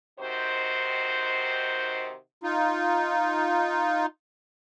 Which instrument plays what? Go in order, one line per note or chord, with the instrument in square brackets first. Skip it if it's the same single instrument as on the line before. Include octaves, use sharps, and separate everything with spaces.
[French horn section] C3 D#3 D#4 F#4 C5
[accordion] D#4 F4